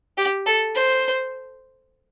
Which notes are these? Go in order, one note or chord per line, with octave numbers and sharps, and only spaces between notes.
G4
A4
C5